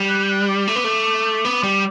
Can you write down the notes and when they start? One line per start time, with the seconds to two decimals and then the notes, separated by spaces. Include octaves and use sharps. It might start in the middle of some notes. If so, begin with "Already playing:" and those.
Already playing: G3
0.09 F#6
0.23 G6
0.29 F#6
0.48 D6
0.68 A3
0.75 B3
0.84 A3
1.45 B3
1.63 G3